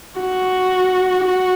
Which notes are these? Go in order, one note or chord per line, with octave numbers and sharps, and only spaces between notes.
F#4
F#4